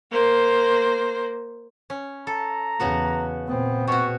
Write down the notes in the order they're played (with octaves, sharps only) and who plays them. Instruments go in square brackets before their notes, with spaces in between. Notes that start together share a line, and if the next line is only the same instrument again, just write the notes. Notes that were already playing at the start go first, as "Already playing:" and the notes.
[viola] A#3 C5
[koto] C#4
[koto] A4 [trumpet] A#5
[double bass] E2 [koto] C#3 B3 F#4
[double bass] A#2 C4 [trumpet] B3
[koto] B2 F#4 [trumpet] C#6